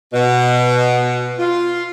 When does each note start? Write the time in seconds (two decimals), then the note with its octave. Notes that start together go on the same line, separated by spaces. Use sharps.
0.12 B2
1.37 F4